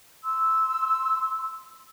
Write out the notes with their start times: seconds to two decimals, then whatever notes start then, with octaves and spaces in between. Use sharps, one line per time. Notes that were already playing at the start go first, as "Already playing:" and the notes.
0.23 C6 E6